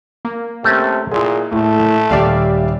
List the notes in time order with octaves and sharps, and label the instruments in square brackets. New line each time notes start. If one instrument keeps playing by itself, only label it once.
[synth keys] A#3
[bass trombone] C3 [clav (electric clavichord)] A3 C#4
[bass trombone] A#2 [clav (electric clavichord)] G#3 E4 [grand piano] G#4
[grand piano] A2 [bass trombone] A3
[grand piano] D#1 G3 G4 [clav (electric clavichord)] A#3 [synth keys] D5 E5 F5